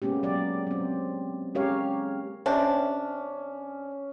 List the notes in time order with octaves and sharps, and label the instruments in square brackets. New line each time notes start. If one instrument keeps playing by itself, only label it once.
[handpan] G#3 A#3 B3 C#4 G4
F#3 G4 D5
F#3 C4
G#3 C#4 G4 A#4 C#5 F5
[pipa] C3 D4 [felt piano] C#4